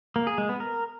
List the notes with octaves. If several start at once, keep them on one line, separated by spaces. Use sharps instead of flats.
A#3
G#4
G#3
B3
A#4